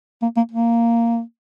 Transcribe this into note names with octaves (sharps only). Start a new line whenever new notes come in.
A#3
A#3
A#3